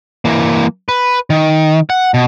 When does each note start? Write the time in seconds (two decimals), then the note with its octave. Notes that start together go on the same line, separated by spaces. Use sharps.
0.25 E3 A#3
0.89 B4
1.30 D#3
1.90 F#5
2.14 B2